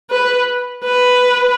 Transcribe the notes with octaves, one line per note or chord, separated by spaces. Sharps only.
B4
B4